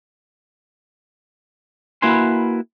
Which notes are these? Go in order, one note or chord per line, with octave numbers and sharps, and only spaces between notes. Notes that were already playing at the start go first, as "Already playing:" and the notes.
A#3 E4 F#4 B4 G#5 C6